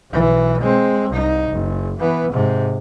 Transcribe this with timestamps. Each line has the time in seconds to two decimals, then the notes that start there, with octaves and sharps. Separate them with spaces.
0.11 B1 E3
0.61 G#3 C4
1.10 C2 D#4
1.51 F#1
1.99 E3 B3
2.33 G#2 C3